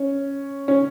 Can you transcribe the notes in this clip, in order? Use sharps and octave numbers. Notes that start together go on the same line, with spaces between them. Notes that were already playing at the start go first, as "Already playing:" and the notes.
Already playing: C#4
C#4